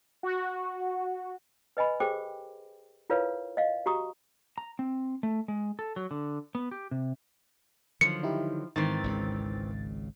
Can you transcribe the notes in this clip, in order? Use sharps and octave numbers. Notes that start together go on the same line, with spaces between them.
F#4
B4 D#5 G#5 B5
G4 G#4 A#4 C5 G5 D6
E4 F4 A#4 B4 C#5 F5
D#5 F5
F#4 G4 A#5 C#6 D#6
A#5
C4
A3
G#3
A4
F#3
D3
B3
G4
C3
D3 D#3 F3 F#3 C#7
D#4 E4 G4
G#2 D#3 E3 C4 A6
G#1 C#2 C#3